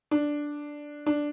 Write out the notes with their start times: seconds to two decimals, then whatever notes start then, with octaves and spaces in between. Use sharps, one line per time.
0.11 D4
1.06 D4